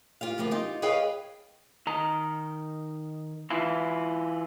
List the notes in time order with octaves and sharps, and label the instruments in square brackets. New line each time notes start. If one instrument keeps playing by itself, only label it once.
[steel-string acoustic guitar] F4 G4 F5
D2 F3 A#3 B3
D#4 F4 G4
G#4 B4 C#5 D#5 F5 G5
[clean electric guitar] D#3 A#5
E3 E4 F4